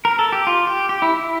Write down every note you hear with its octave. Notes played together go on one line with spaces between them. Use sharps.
A#4
A4
G4
F4
G4
G4
E4
E4